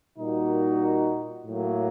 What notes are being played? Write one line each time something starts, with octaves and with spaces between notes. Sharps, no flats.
A#2 G3 A#3 D#4 F#4
A2 F#3 A#3